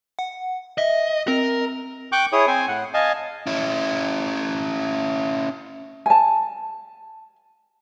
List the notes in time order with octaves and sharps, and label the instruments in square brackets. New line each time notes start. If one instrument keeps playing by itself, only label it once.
[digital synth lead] F#5
[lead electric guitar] D#5 [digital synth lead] E5
[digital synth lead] C4 [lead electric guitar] A#4
[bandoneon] G5 C#6 D6 F#6 G6
E4 G#4 C#5 D#6
C4 C5 G#5
A2 F#5
D#5 F5 G#5 A5
[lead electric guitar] C#4 E4
[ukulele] G#5 A5